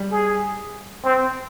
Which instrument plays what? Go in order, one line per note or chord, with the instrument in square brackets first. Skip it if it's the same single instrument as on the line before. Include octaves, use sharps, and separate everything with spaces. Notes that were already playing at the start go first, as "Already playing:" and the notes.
Already playing: [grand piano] G3
[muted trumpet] G#4
C4